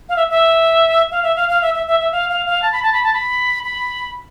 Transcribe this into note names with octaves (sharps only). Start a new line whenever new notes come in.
F5
E5
E5
F5
E5
F5
F5
E5
E5
E5
E5
F5
F5
F5
A5
B5
A5
B5
A5
B5
B5